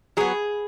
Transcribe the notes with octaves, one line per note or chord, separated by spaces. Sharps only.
F#3 B3 G#4